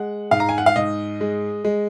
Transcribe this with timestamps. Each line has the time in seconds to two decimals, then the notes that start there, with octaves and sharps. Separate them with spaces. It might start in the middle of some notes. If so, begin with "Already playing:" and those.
Already playing: G#3 F#5
0.31 G#2 F5
0.40 A#5
0.49 G#5
0.58 F#5
0.66 F5
0.76 G#2 D#5
1.21 G#3
1.65 G#3